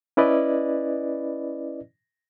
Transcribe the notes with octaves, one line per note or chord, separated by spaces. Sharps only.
C#4 E4 B4 D5 D#5